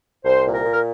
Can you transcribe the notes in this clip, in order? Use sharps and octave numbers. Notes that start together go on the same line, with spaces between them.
C2 C5
A#2
A#4
A#2
A#4